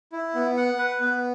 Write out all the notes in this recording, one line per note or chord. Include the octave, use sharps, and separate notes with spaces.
E4
B3
F#5
B4
B3